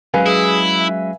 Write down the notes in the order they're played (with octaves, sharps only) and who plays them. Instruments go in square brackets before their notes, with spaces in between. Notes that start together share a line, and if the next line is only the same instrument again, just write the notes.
[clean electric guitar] F#3 G#3 C#4 [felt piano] B4 F5 G#5
[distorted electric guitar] E4 [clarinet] G#4
[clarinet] E5